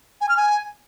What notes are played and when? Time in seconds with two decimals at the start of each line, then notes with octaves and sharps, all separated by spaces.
0.21 G#5
0.29 F6
0.37 G#5